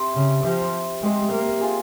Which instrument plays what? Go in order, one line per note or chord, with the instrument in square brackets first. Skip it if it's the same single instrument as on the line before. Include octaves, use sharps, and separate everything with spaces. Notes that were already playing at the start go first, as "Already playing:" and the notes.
Already playing: [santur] C4 G4 C5 E5
[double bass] C#3
[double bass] F3 [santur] C4 G4 C5 E5
[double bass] G#3 [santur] C4 G4 C5 E5
[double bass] A#3
[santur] C4 F4 G#4